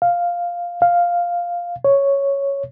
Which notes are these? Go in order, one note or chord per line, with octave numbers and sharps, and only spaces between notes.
F5
F5
C#5